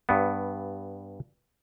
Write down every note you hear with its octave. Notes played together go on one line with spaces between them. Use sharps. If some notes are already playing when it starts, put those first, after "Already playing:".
G2 B3